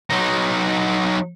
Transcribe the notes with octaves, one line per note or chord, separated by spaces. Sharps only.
F#3 D#4